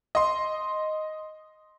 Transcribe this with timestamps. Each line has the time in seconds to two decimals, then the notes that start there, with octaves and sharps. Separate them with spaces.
0.15 D#5 C6